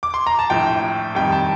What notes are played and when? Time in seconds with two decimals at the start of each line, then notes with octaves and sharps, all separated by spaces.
0.03 D6
0.14 C6
0.27 A#5
0.39 A5
0.50 A#1 A2 F3 G5
1.15 F2 D#3 G3 G5
1.32 A5